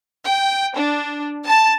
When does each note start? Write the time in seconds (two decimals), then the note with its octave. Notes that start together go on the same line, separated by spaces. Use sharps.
0.24 G5
0.75 D4
1.46 A5